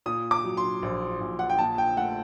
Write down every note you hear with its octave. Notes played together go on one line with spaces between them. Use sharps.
A#2 D#6
D6
F#3
C6
A#1
A#1
F#5
G5
A#2 A5
G5
A3 F#5